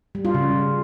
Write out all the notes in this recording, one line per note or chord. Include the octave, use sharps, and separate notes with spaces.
G3
F4
C#3